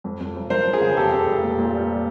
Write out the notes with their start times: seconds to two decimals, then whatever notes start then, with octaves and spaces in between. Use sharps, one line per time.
0.04 F2
0.20 F2
0.35 F1
0.50 F3 A#4 C5
0.66 F3
0.73 G#4 A#4
0.81 C#3
0.96 F1 G4 A4
1.13 F1
1.27 F1
1.43 A#2
1.58 A#2
1.74 G3